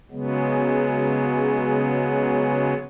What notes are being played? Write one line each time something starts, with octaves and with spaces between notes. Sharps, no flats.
C#3 F#3 G#3 B3